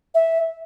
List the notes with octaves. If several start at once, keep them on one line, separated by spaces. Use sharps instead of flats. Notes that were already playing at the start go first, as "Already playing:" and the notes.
E5